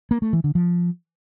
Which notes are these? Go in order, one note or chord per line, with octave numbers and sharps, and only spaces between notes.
A#3
A3
E3
D3
F3